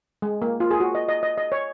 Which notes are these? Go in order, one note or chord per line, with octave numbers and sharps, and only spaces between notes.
G#3
A#3
F4
G#4
F#4
D#5
D#5
D#5
D#5
C#5